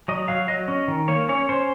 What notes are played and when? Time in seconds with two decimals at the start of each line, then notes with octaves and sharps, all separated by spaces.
0.08 F#3 D#5
0.28 F#3 F5
0.48 F#3 D#5
0.68 C#4
0.88 D#3
1.08 A#3 C#5
1.29 C#4 C#5
1.49 C#4 C5